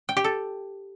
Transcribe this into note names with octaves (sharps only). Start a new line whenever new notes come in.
G5
G4
A4